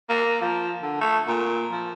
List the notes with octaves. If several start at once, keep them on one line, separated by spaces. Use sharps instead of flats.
A#3
F3
D3
A3
A#2
F3